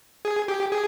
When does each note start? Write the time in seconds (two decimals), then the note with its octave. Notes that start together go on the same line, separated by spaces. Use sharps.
0.25 G#4
0.48 G4
0.72 G#4